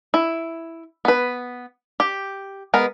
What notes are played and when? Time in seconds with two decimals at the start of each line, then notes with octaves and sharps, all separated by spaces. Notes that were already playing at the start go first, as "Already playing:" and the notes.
0.14 E4
1.05 B3 B4
2.00 G4
2.74 G#3 B3 A#4